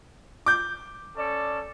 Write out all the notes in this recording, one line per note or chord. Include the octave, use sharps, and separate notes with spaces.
D6 G6
C#4 A4 D5